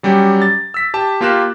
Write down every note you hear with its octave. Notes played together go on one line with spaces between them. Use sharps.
F#3 G3 C#4 G4
A6
E6 B6
G4 A5
A#3 F4 G4 A#4 F#6 E7